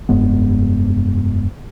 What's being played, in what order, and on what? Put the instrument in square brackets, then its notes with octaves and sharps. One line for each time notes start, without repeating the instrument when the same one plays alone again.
[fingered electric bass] F1 G2 G#3 B3